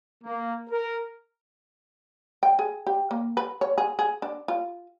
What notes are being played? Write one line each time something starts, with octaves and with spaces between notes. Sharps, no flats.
A#3
A#4
G5
G#4
G4
A#3
B4
C#5
G#4
G#4
D4
F4